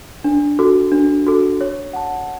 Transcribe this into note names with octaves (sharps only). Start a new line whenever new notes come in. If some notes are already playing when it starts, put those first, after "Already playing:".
D4
F#4 A4
D4
F#4 A4
C#5
F#5 A5